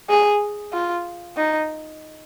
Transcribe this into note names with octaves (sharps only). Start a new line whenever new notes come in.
G#4
F4
D#4